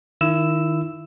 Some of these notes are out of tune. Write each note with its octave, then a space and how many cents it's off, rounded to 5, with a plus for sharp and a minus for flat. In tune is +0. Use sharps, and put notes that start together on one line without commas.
D#3 +0 E4 +25 E6 +0